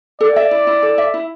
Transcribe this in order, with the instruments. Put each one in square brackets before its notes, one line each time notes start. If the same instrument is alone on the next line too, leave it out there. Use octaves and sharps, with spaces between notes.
[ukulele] A4 [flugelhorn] D5
[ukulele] E5
E4
E4
A4
E5
E4